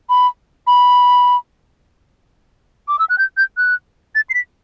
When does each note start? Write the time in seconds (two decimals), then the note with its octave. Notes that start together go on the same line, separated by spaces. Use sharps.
0.09 B5
0.67 B5
2.88 D6
2.99 E6
3.09 F#6
3.18 G6
3.37 G6
3.57 F#6
4.15 A6
4.30 C7
4.34 B6